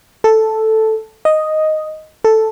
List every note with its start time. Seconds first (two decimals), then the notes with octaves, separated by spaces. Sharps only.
0.24 A4
1.25 D#5
2.24 A4